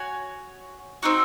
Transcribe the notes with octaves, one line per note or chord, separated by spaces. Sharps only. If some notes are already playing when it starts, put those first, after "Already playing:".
Already playing: F#4 C#5 G#5
C4 D#4 F#4